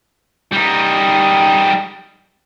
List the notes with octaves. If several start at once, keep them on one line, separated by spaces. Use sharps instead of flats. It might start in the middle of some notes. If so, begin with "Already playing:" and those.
G3 D#4